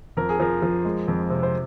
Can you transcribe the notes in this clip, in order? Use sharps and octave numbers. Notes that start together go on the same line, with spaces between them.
F2 A#4
G#4
F3 A#4
F3
G#3
F2
C3
C5